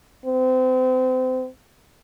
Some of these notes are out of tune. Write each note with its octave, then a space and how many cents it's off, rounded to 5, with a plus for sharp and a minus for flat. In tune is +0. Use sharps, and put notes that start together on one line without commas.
C4 -30